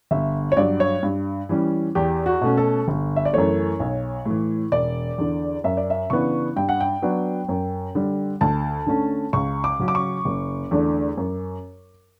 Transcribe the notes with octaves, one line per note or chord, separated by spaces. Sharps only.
G1 E5
C#5
G2 F#3 D5
C#5
G2
E3 G3 C#4
E2 G4
F#4
B2 A3 C#4
A4
G1
E5
D5
F#2 E3 A3 C#5
B1
A2 E3
E1 D5
E2 D3
F#2 E5
D5
E5
C#3 E3 B3 D4 C#6
G2 G5
F#5
G5
F#3 B3 D4
F#2
D3 G3
D2 A5
D3 A3 C#4
C#2 C#6
D6
C#3 F#3 C#4
D6
C#6
F#1
E2 D3 A3 D4
F#2